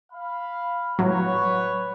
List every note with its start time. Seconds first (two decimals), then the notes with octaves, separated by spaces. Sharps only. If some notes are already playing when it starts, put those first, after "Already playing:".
0.13 F5 B5
0.99 A2 F#3 F#4 B4 C#5